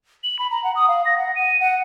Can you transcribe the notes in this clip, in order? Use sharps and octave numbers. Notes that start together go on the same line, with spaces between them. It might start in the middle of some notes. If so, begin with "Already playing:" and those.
F#7
B5
A#5
F#5
D#6
F5
A#6
F#5
D#7
F#5